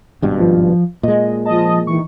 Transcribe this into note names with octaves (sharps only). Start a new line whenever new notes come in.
G#1 G2 B2
F3
A#2 G#3 D#5
F3 D#5 A5
D#3 E3 C#6